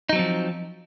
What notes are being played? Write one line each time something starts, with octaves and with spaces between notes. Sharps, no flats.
F3 F#3 C4 D#4